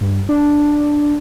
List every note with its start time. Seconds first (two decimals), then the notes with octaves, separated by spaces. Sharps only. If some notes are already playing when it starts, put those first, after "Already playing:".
0.01 G2
0.29 D4